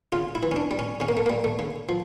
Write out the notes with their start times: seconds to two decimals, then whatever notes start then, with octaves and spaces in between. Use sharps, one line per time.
0.12 C#3 F4
0.35 E4
0.43 E3
0.52 C#4
0.56 D4
0.71 G3
0.79 C#4
1.00 C#3 C#4
1.09 A#3
1.17 A3
1.26 G3 A#3
1.44 A3
1.59 C#3
1.89 F3